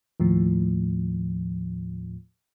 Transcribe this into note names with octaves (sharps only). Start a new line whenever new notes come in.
D#2 A2 F3